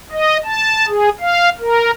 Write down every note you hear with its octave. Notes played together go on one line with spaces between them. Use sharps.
D#5
A5
G#4
F5
A#4